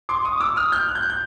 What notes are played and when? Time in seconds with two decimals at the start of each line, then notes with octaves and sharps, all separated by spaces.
0.09 C6 D6
0.25 C#6 D#6
0.36 D#6
0.40 D6 E6
0.56 D#6 F6
0.72 F6 G6
0.88 F#6
0.95 G6
1.02 F#6
1.10 G6